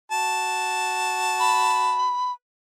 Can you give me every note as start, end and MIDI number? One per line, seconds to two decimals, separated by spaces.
0.12 2.15 66
0.12 2.15 81
1.40 2.32 83